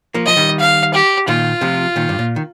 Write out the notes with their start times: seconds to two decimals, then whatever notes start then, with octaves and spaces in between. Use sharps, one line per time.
0.14 F3 A#3
0.26 F3 D#5
0.37 D#3 G3
0.60 F5
0.94 G4
1.28 A#2 D#3 F4
1.61 C3 F3
1.96 A#2 D#3
2.09 G2
2.19 A#2
2.36 D#3